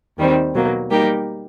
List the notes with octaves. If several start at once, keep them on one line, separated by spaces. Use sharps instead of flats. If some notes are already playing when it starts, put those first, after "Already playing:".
D#2 D#3 G3 C4
B2 F#3 A#3
G3 A#3 D#4 G4 A#4